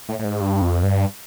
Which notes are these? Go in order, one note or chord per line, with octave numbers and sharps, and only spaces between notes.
A2
A2
G#2
G2
F2
G2